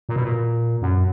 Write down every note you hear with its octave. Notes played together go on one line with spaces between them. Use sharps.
A#2
B2
A#2
F#2